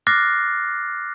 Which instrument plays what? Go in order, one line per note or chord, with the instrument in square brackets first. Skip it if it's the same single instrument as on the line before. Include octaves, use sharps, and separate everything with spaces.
[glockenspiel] D6 F6 F#6 A6 A#6 C7